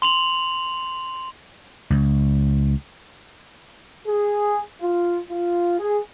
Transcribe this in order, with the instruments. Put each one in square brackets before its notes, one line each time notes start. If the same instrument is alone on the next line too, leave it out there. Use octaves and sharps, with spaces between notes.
[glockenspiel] C6 F7 F#7
[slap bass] C#2
[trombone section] G#4
F4
F4
G#4